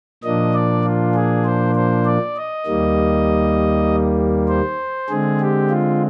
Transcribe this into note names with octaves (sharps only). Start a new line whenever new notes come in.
A#2 F3 A#3 D4 D#5
D5
F4
G#4
C5
C5
D5
D#5
D#2 D#3 G3 A#3
C5
D3 G#3 C4 G#4
G4
F4